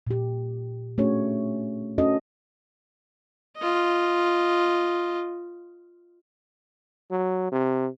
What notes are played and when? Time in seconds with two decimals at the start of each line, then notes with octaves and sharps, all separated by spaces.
0.07 A#2 G4
0.98 A3 C#4 D4 F#4 G#4 C#5
1.98 C#4 D4 F#4 A4 D#5
3.57 F4 D#5
7.11 F#3
7.52 C3